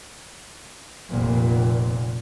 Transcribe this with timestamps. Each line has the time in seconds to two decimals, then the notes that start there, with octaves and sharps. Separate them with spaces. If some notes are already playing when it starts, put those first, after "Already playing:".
1.08 F1 A#2